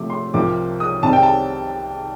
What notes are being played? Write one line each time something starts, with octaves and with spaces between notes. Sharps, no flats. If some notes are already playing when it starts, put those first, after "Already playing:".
Already playing: C3 F3 A3 D6
C6
C2 C3 F3 A#3 D6
D#6
C2 C3 D#3 G3 C4 A5
G5
A5